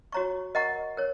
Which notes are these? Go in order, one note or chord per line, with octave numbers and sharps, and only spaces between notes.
F#4 C#5 A#5 C#6
A#4 D#5 F#5 A#5 C#6
A#4 C#5